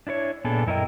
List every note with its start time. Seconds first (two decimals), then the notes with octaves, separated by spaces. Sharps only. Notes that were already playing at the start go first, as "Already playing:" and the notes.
0.07 D4 E4 B4 C#5
0.44 A#2 B3 D4 G#4 A4
0.67 F#2 E4 A#4 D#5 G5